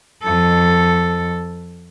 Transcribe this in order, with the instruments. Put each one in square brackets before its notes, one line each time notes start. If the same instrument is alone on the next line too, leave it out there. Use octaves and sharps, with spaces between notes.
[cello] F2 A4